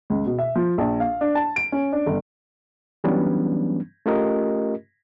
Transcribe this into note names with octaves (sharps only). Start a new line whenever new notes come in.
C#2
B2
E5
F3
A#1
F5
D4
A5
D7
C#4
D4
G1
E3 F#3 G3 B3 C#4 D4
A3 C#4 F4 G4 A#4 D#5